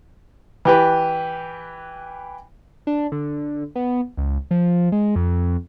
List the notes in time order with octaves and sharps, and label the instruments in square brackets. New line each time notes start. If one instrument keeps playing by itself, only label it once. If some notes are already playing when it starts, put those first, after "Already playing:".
[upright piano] E3 G4 B4
[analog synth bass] D4
D3
B3
C#2
F3
G#3
F2